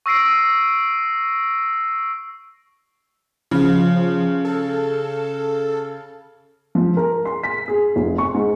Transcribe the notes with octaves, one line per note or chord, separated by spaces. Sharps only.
C#6 E6 A#6 C7 D7
C#3 F3
A4
F3
A#4
C6
B6
G#4
F1
C#6
G#2